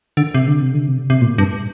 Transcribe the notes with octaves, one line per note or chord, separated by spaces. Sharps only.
D3
C3
D3
C3
D3
C3
C3
A#2
G2